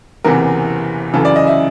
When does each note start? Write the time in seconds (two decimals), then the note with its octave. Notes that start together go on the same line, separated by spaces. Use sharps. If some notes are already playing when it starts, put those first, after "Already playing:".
0.24 F#1 E2 C3 E3 A#4
1.14 F#2 C#3 E3 A4
1.25 D5
1.36 D#5
1.47 E5